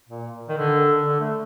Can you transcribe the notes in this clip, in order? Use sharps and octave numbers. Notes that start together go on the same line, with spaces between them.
A#2
D#3
D3
D3
A3